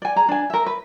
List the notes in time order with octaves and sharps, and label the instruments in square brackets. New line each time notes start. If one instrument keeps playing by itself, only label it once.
[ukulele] D5 G#5
G#4 A#5
D4 G#5
A#4 E5
B4